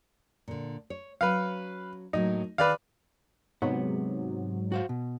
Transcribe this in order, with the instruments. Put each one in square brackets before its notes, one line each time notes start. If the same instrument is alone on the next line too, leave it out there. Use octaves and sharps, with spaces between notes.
[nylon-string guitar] A#2 D3
C#5
[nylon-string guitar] F#3 C#4 [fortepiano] B4 F5
[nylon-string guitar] A2 F#3 A#3 [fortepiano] D#4
[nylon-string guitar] D#3 G#4 [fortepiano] B4 D5 F5
[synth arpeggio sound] G#2 F#3 [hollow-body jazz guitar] C3 B3
[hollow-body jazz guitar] F#4 C5 F5
B2